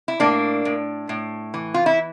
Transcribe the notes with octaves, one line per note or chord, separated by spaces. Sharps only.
E4
A2 A#3 D4
A2
A2
E3
F4
E4